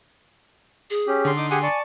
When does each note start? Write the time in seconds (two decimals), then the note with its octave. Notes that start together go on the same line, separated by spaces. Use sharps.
0.90 G#4
1.07 C#4 G4
1.25 D3 C6
1.37 D#4 D6 D#6
1.50 G4 G#4 F#5 G#5
1.63 D5 A5 C#6